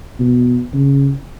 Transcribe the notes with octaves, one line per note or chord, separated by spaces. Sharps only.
B2
C#3